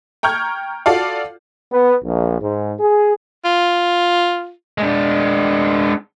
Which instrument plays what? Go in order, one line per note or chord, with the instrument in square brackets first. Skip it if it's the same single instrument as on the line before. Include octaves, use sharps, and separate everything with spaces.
[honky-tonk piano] G5 A#5 C#6 F6 G6 G#6
F4 F#4 A4 D5 F5
[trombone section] B3
A#1
G#2
G#4
[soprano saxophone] F4
[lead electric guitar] G#3 D4